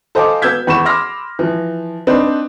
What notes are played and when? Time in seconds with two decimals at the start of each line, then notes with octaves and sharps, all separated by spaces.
0.15 A4 C5 D#5 F5 G#5 D6
0.42 B3 E6 G6 G#6 B6
0.67 E2 B5 C#6 E7
0.85 B5 C6 D6 E6 F6 A#6
1.39 E3 F3
2.07 C4 D4 D#4 B4 C5